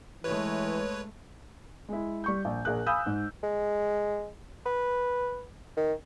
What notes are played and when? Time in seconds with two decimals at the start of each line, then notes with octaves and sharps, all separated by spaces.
0.24 E3 G#3 A3 B4 C#5
1.89 G#3 E4
2.24 G3 C#6 G6
2.45 A#1
2.65 A#1 G#4 A#4 F#6
2.86 F5 G#5 B5 D#6 E6 G6
3.06 G#2
3.43 G#3
4.66 B4
5.77 D#3